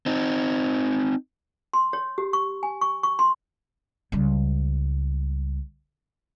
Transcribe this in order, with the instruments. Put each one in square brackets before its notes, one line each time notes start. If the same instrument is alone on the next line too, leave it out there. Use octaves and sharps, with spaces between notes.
[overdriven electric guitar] C4 D#4
[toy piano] C6
C#5
G4
C#6
G#5
C#6
C#6
C6
[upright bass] C#2 G3